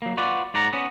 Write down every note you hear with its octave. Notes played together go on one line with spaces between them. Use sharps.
F#3 A#3
F4 F#4 B4 D5
G#2 D5 F#5 A#5
B3 C#4